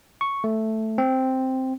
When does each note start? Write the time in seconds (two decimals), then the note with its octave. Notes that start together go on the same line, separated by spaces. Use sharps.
0.21 C#6
0.44 A3
0.98 C4